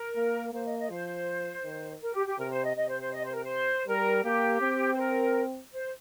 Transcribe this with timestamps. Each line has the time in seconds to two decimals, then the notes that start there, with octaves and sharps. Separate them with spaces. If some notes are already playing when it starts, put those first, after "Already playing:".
Already playing: A#4
0.16 A#3
0.53 A#3 C5
0.65 D#5
0.78 D#5
0.90 F3 C5
1.64 D#3
2.01 A#4
2.13 G4
2.26 G4
2.38 C3 A#4
2.51 C5
2.63 D#5
2.76 C3 D#5
2.88 C5
3.00 C5
3.13 D#5
3.23 C5
3.33 A#4
3.43 C5
3.87 G3 A#4
4.24 A#3 G4
4.61 C4
4.93 C5
4.98 A#4
5.72 C5